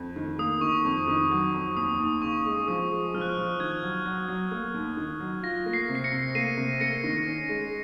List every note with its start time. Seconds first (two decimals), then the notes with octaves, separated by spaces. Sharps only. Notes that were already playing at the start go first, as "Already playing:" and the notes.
Already playing: F2
0.16 D#3
0.39 A#3 D#6
0.61 D#3 C#6
0.85 F2
1.08 D#3
1.31 F#3
1.53 F2
1.76 D#2 D#6
2.00 D#2
2.22 C#3 C#6
2.46 G#3
2.68 F3 D#6
2.91 G#3
3.14 F3 F6
3.21 F#6
3.29 F6
3.37 F3
3.60 D#3 G#6
3.83 F#3
4.05 F#3
4.28 F#3
4.51 A#3
4.74 D#2
4.97 D#3
5.20 F#3
5.43 F4 A#6
5.66 A#3
5.73 C7
5.89 C3
5.95 C7
6.04 A#6 C#7
6.12 C3
6.35 A#3 C7 D#7
6.57 C3
6.80 A#3 A#6 C#7
7.04 D#3
7.26 C#4
7.49 G#3